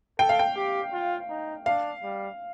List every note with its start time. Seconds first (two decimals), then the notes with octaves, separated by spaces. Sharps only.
0.19 A4 G5
0.29 F5
0.39 G5
0.56 G4
0.92 F4
1.29 D#4
1.66 D4 F5
2.02 G3